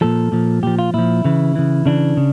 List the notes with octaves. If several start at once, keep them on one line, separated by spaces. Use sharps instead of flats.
A#2 F3 A4
A#2 F3
A#2 F3 G4
F4
A#2 F3 E4
C#3 E3
C#3 E3
C#3 E3 D4
C#3